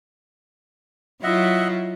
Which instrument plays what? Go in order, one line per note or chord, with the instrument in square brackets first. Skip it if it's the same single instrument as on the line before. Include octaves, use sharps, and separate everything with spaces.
[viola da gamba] F#3 E4 F4 [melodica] D#5 E5 F#5